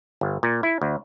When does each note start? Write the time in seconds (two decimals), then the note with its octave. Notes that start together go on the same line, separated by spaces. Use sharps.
0.21 G1
0.43 A#2
0.63 E4
0.82 D2